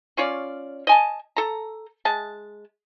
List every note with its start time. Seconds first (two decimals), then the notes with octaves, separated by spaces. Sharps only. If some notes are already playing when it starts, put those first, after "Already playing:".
0.17 C#4 F4 C#5 D5
0.87 D#5 G#5 A5
1.37 A4 A#5
2.05 G#3 A5